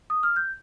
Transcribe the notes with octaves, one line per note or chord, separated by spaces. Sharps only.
D#6
F6
G6